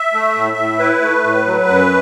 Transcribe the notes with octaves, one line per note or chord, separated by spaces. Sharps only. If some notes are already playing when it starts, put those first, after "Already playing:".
Already playing: E5
A3
A2
A2
E4 B4
A3
A2
F#3
F#2